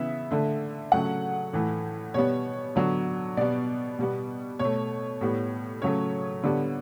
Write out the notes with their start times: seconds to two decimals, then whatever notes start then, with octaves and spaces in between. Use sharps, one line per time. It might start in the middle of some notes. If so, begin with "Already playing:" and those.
Already playing: C#3 E3 B3 E5
0.31 D3 A3
0.92 C#3 F#3 A3 F#5
1.53 A2 E3 A3
2.14 B2 G3 B3 C#5
2.76 D3 F#3 B3
3.37 B2 G3 B3 D5
3.99 B2 G3 B3
4.59 B2 A3 C#5
5.21 A2 G3 B3
5.82 C#3 F#3 A3 C#5
6.44 D3 G3 B3